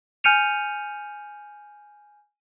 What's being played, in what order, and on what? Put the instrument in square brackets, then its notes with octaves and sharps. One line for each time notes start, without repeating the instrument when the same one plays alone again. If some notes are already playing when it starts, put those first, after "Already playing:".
[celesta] G#5 F6 G6 C#7 D#7 F7